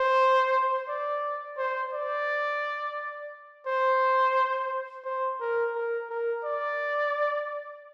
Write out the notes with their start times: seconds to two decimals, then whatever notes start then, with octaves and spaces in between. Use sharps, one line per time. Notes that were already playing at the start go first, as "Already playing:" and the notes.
Already playing: C5
0.88 D5
1.58 C5
1.93 D5
3.67 C5
5.05 C5
5.41 A#4
5.75 A#4
6.09 A#4
6.45 D5